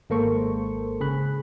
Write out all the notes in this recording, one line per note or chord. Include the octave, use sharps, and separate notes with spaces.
G#1 G#3 A#3 A4 C5 C#6
C#3 G#4 B5 F#6